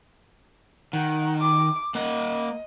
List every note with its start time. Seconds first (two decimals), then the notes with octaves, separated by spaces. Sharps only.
0.93 D#3 F#5
1.40 D6
1.95 A#3 D#5 F#5